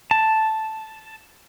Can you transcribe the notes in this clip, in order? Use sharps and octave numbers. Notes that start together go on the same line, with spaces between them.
A5